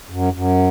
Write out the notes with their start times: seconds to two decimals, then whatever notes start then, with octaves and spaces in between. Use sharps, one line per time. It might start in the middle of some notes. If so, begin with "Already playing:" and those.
0.10 F#2
0.33 F#2